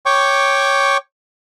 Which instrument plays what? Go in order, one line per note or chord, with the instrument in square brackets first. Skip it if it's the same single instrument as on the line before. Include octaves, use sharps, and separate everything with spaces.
[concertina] C#5 G5 C#6 D6